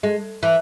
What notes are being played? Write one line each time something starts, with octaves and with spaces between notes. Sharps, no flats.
G#3
E3